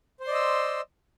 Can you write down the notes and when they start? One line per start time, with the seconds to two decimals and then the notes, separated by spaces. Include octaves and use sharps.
0.20 C5
0.24 C6
0.27 D5
0.31 D#5
0.35 E6